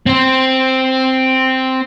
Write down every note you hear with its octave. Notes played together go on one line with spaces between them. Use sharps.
C4 C5